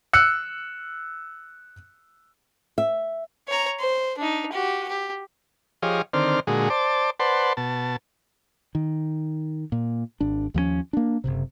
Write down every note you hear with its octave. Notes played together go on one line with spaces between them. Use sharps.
E6 F#6 C#7
E5
C#5 A#5
C5
D4 D#4
F#4 G4
G4
F3 G4 G#4 C#5 D#5 F5
D3 D#3 C4 C5 D5 F6
A#2 D3 G#3 F#4 G#4
C5 D5 A5 D6
B4 C5 D5 F#5 A5 C6
B2 A5
D#3
A#2
G#1 D4
D#2 F3 F#3 C#4
A#3 D4
F#1 F#2 C3